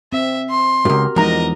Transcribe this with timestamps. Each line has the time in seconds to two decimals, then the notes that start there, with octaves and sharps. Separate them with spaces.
0.13 C4 E5
0.49 C6
0.85 C#2 G2 F#4 G4 A#4
1.16 E2 F3 G#3 D#4 A#4 D#5 A#5